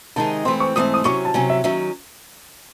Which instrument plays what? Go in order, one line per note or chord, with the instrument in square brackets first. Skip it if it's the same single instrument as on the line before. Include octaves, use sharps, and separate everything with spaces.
[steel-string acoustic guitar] C3 D#3 G#3 D#4 G#4 [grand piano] A5
[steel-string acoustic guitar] G#2 E3 A3 C4 [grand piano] C6
[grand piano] C#6
[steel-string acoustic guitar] G#2 E3 A3 C4 [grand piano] D#6
[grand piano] D#6
[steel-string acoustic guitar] C3 F#3 C#4 [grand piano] C#6
[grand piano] A5
[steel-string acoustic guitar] C3 F#3 C#4 [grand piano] G#5
[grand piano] E5
[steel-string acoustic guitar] D#3 F#3 C#4 [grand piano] E5